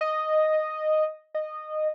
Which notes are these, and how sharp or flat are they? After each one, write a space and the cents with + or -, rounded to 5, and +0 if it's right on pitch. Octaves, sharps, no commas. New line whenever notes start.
D#5 -5
D#5 -15